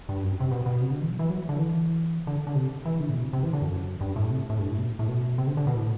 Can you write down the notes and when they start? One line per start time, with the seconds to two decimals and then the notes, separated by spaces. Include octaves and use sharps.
0.09 G2
0.23 F#2
0.40 C3
0.51 B2
0.66 B2
0.81 C3
0.91 D3
1.01 E3
1.10 F#3
1.19 E3
1.30 F#3
1.49 D3
1.58 E3
2.27 D3
2.47 D3
2.55 C3
2.85 E3
3.00 D3
3.09 A2
3.13 B2
3.23 C3
3.33 C3
3.43 E3
3.53 D3
3.62 F#2
4.01 G2
4.16 A2
4.30 C3
4.50 A2
4.59 G2
4.70 A2
4.78 B2
4.89 A2
4.99 A2
5.08 B2
5.38 C3
5.47 D3
5.57 D3
5.67 B2
5.76 A2